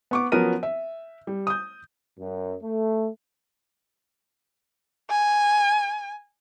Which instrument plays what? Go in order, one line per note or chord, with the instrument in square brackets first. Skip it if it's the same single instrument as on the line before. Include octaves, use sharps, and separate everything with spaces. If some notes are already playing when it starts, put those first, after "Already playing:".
[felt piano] B3 C#6 D6
F3 F#3 B3 C#4 A#4 D#7
E5
G3
D#6 G6
[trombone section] F#2
A3
[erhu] G#5